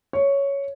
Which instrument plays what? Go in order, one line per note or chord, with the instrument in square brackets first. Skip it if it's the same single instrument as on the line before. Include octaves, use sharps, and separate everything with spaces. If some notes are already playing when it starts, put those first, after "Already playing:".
[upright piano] C#5